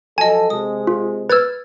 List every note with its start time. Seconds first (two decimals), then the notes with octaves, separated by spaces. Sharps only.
0.18 F3 F#3 A4 D#5 G#5 A5
0.50 C3 G#3 D#6
0.87 F4
1.30 B4 E6 F6 G#6 A6